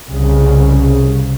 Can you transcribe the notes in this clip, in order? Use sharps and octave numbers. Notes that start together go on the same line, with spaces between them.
C2 C#3